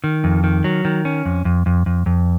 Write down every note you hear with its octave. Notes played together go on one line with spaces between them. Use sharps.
D#3
F2
D#3
F#3
D#3
C#4
F2
F2
F2
F2
F2